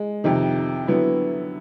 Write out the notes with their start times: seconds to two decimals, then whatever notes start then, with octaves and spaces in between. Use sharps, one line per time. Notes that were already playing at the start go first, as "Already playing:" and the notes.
Already playing: G#3
0.24 F2 C3 D#3
0.87 D3 F#3 B3 E4